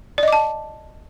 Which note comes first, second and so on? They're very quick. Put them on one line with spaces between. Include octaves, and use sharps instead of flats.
D5 D#5 D6 A5